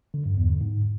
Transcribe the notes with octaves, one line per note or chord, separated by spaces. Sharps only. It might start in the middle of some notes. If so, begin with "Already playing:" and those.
D3
G2
E2
D3
G#2